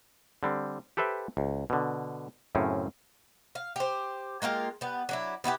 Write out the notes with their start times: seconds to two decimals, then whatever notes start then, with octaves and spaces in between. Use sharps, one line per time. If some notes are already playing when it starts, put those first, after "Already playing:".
0.43 D3 G3 C4
0.97 G4 A4 B4 C5 E5 G5
1.37 C#2
1.70 B2 D3
2.55 F#2 A2 C#3 C4 C#4
3.55 F5
3.76 G4 C5
4.42 G#3 A#3 F4 G4
4.81 G3 B3
5.09 F#3 D4 E4
5.44 B3 E4 F4 G4